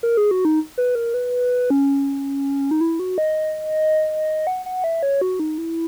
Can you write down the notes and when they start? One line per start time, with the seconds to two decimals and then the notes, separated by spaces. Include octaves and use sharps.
0.03 A#4
0.17 G#4
0.31 F#4
0.45 D#4
0.78 B4
0.95 A#4
1.14 B4
1.70 C#4
2.71 D#4
2.81 E4
2.99 F#4
3.18 D#5
4.47 F#5
4.66 F#5
4.84 E5
5.03 C#5
5.21 F#4
5.40 D#4
5.58 E4